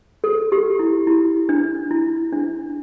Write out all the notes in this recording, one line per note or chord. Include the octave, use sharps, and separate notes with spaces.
A4
G4
E4
E4
D4
E4
D4